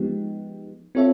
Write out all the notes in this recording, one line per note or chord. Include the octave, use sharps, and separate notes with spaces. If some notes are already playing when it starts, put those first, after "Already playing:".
Already playing: F3 G#3 B3 D#4 G4
C4 F4 A4 C#5 E5